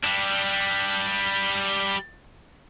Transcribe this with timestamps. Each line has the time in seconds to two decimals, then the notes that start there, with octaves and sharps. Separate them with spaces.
0.04 G3 D4